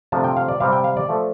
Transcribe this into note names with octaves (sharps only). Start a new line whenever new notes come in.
C3 F3 A3 D4 A5
G5
F5
D5
C3 G3 C4 F5
G5
F5
D5
F3 A3